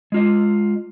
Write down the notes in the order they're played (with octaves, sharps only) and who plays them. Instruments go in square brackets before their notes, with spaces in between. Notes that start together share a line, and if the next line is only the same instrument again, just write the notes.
[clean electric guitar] G#3 F4 D#5